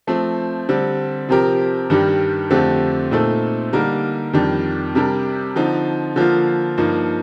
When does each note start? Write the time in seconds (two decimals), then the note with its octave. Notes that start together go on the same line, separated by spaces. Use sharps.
0.07 F3 A3 C4
0.69 D3 G3 C4
1.29 C3 F3 C4 G4 A#4
1.90 G2 D#3 G3 D4 G4
2.50 F2 D3 A3 C4 G4
3.11 A#2 A3 C4 D#4 A4
3.73 D3 G3 A#3 D#4 A#4
4.33 F2 D#3 G3 D4
4.95 C3 G3 D4 G4 A#4
5.56 D3 F3 C4 D#4
6.16 D3 F3 A#3 F4
6.78 G2 F3 A#3 D#4